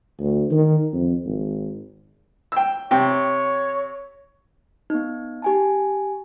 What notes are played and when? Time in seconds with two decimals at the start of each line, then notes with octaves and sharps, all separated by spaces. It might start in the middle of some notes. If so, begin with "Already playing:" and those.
0.20 D2
0.51 D#3
0.93 F2
1.25 G#1
2.52 G5 E6
2.91 C3 C#5 G5
4.90 B3 D#4
5.42 G4 G#5 A5